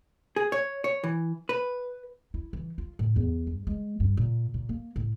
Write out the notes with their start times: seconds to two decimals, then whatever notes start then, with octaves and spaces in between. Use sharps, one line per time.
0.36 G#4
0.52 C#5
0.84 C#5
1.04 E3
1.49 B4
2.34 E4
2.53 E3
2.78 F4
2.99 A2
3.16 E2
3.47 G2
3.67 G#3
4.00 G2
4.17 A#2
4.54 A#2
4.69 A#3
4.96 A2